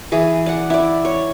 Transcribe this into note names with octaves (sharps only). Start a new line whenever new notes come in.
E3 G#4
D5 F#5
E4 D5
C#5